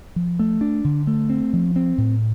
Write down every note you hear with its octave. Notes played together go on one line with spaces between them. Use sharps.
F3
A3
D4
D3
A3
C4
F3
C4
A2